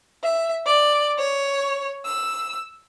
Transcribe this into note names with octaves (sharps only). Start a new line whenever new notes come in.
E5
D5
C#5
E6